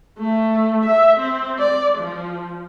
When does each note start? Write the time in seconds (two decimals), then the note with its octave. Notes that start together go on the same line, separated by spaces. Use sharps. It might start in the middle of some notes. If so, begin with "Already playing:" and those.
0.20 A3
0.85 E5
1.20 C4
1.59 D5
1.97 F3